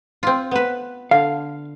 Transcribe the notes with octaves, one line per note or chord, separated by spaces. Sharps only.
C4 F4
B3 B4
D3 F5